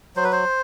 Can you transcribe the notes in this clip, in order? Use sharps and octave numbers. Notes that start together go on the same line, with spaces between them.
F#3 C5
B4
C5